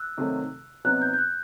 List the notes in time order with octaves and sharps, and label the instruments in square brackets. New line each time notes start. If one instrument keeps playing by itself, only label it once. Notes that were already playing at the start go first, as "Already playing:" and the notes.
Already playing: [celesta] E6 F#6
[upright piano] C3 D#3 F#3 A3
[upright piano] C3 F#3 B3 D#4 [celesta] F#6
[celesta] G6
G6
F#6